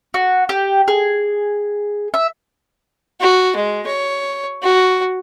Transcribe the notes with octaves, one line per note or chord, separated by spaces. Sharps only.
F#4
G4
G#4
E5
F#4
G#3
C#5
F#4